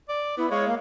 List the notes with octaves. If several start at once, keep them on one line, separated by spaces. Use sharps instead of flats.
D5
B3 E4
G#3 C#5 F5
A#3